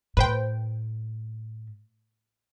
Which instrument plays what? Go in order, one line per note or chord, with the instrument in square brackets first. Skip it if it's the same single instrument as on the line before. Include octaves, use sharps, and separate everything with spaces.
[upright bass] A2 [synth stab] B4 C5 G5